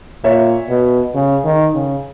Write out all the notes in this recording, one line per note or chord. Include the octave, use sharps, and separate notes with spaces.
A#2 C#5 E5
B2
C#3
D#3
C#3